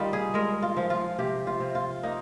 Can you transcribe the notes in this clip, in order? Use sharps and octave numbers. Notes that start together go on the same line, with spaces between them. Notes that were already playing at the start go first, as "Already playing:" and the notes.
Already playing: D#3 G3 D#4 F4
G#4
G#3 A#4
F4
F3
F4
C3 G4
F4
C3
F4
A#3 D#4